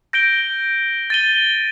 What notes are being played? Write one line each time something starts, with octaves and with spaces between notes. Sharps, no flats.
G6 A#6 D7 G7
A6 D#7 G7